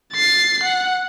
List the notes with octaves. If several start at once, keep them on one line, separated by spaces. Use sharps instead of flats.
A6 C7
F#5